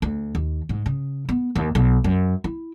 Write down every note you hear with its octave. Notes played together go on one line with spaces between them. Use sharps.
D2
D#2
G#2
C#3
B3
D#2
B1
F#2
E4